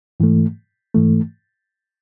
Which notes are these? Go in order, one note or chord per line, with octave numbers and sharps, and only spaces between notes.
G#2 E3 A3
G#2 E3 A3